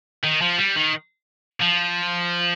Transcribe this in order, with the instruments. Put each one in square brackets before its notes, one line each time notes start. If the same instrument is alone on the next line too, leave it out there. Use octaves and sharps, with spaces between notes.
[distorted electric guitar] D#3
F3
G3
D#3
F3